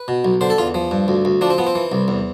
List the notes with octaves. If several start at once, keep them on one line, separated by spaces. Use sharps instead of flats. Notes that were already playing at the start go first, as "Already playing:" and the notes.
Already playing: B4
B2
B1
D3 C5
A4
E2 F4
F3
G2
D2
D2
F3 D4
C4
F3 B3
C4
E3
C2
E2